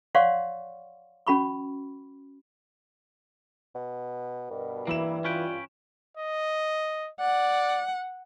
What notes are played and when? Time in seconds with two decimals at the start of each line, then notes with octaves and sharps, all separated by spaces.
0.15 C#5 D5 F5 F#5 C6 C#6
1.27 C#4 F#4 B5 C#6
3.75 B2
4.51 G2 B2 A#4
4.87 E3 A#3 E4 E7
5.25 C#4 F4 B4 G5
6.17 D#5
7.20 D5 F#5